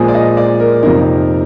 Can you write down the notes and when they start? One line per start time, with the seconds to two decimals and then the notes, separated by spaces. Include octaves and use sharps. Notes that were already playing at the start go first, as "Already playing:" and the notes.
Already playing: A#2 F3 G#3 G#4
0.08 D5
0.14 D#5
0.37 D5
0.60 A#4
0.83 F2 C3 F3 A#3 D#4 A#4